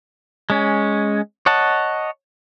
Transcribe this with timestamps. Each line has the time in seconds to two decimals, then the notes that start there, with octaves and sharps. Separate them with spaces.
0.50 G#3 C#4
1.46 C#5 D#5 F#5 A5